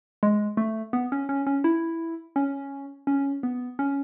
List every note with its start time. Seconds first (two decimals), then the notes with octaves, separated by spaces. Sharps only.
0.23 G#3
0.57 A3
0.93 B3
1.12 C#4
1.29 C#4
1.47 C#4
1.64 E4
2.36 C#4
3.07 C#4
3.43 B3
3.79 C#4